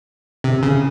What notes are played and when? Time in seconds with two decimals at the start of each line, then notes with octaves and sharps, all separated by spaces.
0.44 C3
0.63 C#3